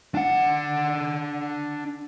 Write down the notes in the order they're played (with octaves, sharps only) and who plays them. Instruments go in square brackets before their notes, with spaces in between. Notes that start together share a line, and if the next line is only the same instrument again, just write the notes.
[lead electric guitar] D4 F#5